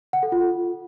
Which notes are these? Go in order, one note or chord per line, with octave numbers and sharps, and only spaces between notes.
F#5
A4
F4